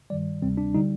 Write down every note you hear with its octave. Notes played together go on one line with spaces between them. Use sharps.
G2 D#3 G3 D5
D2 C3 G3 C4
D4
D3 G3 D#4